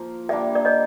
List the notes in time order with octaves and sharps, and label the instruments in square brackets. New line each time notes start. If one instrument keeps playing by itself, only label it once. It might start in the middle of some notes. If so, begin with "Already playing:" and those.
Already playing: [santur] F3 A#3
[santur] G3 A#3 D4 [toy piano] D5 E5
[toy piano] D5
C#5 D#5